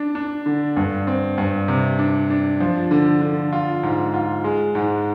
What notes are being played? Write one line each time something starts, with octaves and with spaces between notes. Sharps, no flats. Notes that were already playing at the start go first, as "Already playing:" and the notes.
Already playing: D4
D4
D3
G2
C4
G2
C3
D4
D4
F3
D3
D3
F4
G#2
F4
G#3
G#2